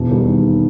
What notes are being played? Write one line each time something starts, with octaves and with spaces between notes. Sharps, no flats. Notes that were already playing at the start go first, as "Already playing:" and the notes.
Already playing: E1
D#2 D#3 G3